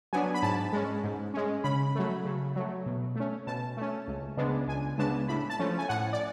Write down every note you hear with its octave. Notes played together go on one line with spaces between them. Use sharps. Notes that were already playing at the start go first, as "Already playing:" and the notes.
F#3 B3 D4 G#5
B5
G#2 A5
G#3 C#4
G#2
G#3 C#4
C#3 B5
F#3 A3
C#3
F#3 A3
B2
A3 C#4
B2 A5
A3 C#4
C#2
C#3 G#3 B3 D4
C#2 G#5
C#3 G#3 B3 D4 A5
A2 B5
A5
F3 A3 C#4
G#5
A2 F#5
D5